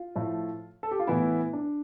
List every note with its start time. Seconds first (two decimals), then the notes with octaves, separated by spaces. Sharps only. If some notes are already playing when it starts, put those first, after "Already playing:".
Already playing: F4
0.16 A2 F3 A3
0.83 A4
0.91 G4
1.00 F4
1.07 A2 E3 B3 E4
1.53 D4